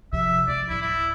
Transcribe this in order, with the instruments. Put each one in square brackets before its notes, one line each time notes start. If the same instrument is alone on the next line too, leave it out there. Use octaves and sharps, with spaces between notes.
[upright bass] C3 F3 [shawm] E5
[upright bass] G#3 [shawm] D5
[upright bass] D1 F#3 [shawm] E4
[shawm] E4